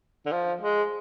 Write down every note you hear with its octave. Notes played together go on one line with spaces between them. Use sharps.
D3
F3
G#3